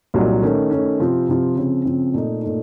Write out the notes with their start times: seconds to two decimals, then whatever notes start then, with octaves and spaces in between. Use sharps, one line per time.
0.14 C2 A#2 F#3 A#3 D#4
0.42 D#3 A3 C#4
0.71 D#3 A3 C#4
1.00 C3 F3 C4 F4
1.28 C3 F3 C4 F4
1.56 C#3 F3 C4
1.85 C#3 F3 C4
2.13 A#2 A3 D#4
2.42 A#2 A3 D#4